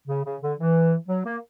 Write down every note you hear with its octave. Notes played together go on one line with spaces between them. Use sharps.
C#3
C#3
D3
E3
F#3
A#3